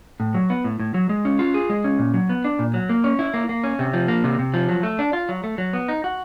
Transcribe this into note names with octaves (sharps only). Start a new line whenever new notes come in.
A2
F#3
B3
A2
A2
F#3
G#3
C#4
F4
G#4
G#3
C#4
A#2
F#3
B3
D4
A#2
F#3
A#3
C#4
E4
A#3
A#3
C#4
C3
F3
A#3
C3
C3
F3
F#3
A3
D4
F4
F#3
A3
F#3
B3
D#4
F#4